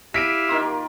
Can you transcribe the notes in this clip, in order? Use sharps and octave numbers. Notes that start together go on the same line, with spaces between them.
E4 G4 E5 F5 B6 D7 D#7
D#3 A#3 F4